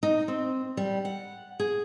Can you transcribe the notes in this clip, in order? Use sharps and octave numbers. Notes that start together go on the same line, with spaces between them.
D#4
C4
G3
F#5
G#4